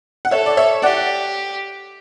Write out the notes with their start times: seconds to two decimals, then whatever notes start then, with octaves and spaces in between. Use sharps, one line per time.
0.25 F#5
0.31 A4 C#5 E5
0.46 D5
0.57 C#5 E5
0.82 G4 D5 F#5